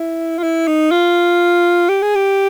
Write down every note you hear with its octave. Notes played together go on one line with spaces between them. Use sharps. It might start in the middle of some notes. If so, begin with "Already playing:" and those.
Already playing: E4
F4
E4
D#4
F4
G4
G#4
G4